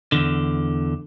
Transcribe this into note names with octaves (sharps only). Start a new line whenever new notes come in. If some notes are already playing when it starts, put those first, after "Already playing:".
E2 D3